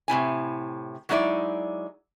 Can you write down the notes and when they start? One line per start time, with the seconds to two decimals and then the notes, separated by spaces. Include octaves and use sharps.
0.08 A2 C3 E4 G#5
1.09 F#3 G#3 D#4 E4 D5